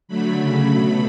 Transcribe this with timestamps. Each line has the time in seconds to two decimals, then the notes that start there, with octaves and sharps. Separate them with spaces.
0.08 D3 F#3 A3 B5
0.38 C#3 F#3 A3
0.69 B2 F#3 A3